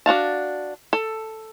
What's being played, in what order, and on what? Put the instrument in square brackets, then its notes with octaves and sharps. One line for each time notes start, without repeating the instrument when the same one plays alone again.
[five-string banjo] D4 F#4 F5 A5
A4